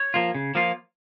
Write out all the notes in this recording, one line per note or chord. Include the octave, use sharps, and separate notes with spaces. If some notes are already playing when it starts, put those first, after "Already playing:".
Already playing: C#5
F3 A#3 F4
C#3
F3 A#3 F4